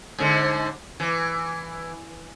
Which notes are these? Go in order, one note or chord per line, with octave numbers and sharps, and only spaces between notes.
G#2 D3
E3